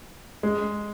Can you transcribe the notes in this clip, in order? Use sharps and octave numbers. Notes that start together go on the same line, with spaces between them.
G#3